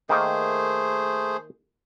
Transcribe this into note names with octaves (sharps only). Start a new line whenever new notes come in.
D#3 A3 A#3 D#4 G#4 C5